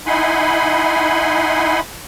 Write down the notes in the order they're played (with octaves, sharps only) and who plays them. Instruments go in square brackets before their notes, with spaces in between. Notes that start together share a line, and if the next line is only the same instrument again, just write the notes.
[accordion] D#4 E4 F#5 G#5 B5 C6